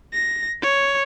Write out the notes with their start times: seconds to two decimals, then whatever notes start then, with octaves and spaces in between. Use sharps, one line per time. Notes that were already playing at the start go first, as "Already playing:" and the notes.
0.13 A#6
0.62 C#5